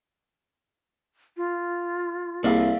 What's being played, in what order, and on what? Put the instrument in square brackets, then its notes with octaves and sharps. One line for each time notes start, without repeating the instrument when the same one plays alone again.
[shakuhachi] F4
[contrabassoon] C2 [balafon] A#3 G#4 [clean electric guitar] D5 E5 F5